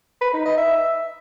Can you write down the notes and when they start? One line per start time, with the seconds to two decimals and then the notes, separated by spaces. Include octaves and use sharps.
0.22 B4
0.34 D#4
0.46 D#5
0.58 E5